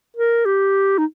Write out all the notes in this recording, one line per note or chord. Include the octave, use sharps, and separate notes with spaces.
A#4
G4
D#4